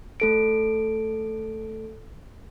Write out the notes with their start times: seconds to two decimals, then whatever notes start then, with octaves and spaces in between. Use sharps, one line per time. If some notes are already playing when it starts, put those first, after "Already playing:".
0.20 A3 A4 D7